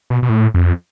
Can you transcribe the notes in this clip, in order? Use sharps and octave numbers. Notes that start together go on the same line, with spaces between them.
B2
B2
A2
F2